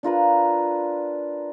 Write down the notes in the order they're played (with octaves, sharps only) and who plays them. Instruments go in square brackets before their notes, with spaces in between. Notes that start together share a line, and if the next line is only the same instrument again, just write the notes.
[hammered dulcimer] D4 F4 A#4 B4